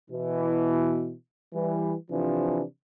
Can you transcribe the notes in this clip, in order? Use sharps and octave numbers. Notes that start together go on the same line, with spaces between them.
B2 E3
E3 G3
C3 E3 F3 D4